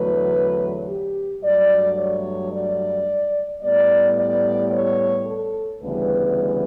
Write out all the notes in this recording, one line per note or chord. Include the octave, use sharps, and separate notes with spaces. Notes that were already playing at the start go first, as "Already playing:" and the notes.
Already playing: E2 D3 F#3 A3 B4
G4
G2 F#3 A3 D5
C#5
D5
A2 G3 B3 D5
D5
C#5
A4
D2 C#3 E3 G3 B3 B4